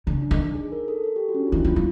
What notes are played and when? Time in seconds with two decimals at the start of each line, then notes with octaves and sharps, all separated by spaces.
0.07 C#3 D4
0.22 D4
0.31 D#3
0.39 D#4
0.55 G#4
0.72 A#4
0.88 A4
1.04 A4
1.16 G4
1.29 F#4
1.34 C#4
1.40 D4
1.47 F4
1.52 D#3 E4
1.65 F3
1.68 F4
1.76 F#3